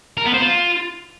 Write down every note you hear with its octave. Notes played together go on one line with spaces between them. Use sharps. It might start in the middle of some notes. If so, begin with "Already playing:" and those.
A#4
B3
C5
F4